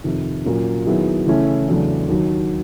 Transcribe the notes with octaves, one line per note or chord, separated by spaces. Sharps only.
F2 C3 D#3
A#2 F#3 A#3 C#4
D#3 F#3 B3 E4 G#4
C#3 E3 A3 C#4 E4
E2 C#3 F#3 A3 D4
D#2 D#3 F#3